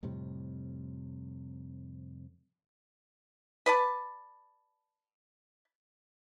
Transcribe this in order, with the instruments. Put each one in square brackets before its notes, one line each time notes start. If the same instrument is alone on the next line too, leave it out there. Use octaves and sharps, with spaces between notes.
[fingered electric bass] F2 A2 C3 G3
[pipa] B4 D5 A5